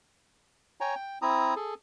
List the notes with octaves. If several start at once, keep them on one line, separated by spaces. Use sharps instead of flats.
C#5 G5 G#5 A#5
G5
C4 E4 A#5 D#6
G#4 A4